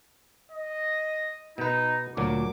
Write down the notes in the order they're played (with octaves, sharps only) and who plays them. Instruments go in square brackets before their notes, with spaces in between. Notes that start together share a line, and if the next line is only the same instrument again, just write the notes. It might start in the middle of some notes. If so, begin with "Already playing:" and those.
[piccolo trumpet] D#5
[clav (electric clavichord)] B2 B4 [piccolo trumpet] D#4
[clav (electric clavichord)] D2 A#2 F#3 [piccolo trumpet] D6